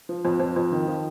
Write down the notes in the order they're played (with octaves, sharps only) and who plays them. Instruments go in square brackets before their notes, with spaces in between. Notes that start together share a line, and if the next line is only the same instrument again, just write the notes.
[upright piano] F3
F2
F2
F2
D#3
F3